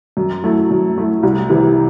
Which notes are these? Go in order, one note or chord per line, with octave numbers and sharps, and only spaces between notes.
F#2
F#3 A3 E4
F#2
F#3 A3 E4
C2
C3 E3